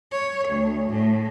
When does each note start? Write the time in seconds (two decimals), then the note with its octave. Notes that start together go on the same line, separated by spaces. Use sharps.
0.12 C#5
0.49 D2
0.90 A2